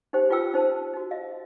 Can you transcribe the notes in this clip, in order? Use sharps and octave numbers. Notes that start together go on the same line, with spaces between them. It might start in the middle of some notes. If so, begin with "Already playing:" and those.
D#4 G4 C5 G5
D#4 F4 B4 G5 E6
D#4 C5 A5
D#4 F#4
D#5 F5